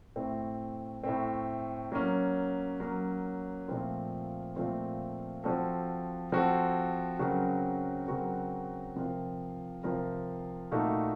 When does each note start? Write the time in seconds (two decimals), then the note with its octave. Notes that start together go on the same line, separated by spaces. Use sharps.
0.16 A2 A3 C4
1.04 A2 A3 C4
1.92 F#3 A#3 C#4
2.80 F#3 A#3 C#4
3.68 A#2 F3 A3 C4 F4
4.56 A#2 F3 A3 C4 F4
5.44 F3 C4 F#4 A4
6.32 F3 C4 F#4 A4
7.19 C#3 F#3 C4 F#4 A#4
8.08 C#3 F#3 C4 F#4 A#4
8.96 C3 F3 C4 F4 A#4
9.83 C3 F3 C4 F4 A#4
10.71 A#2 A3 D#4 F#4 A4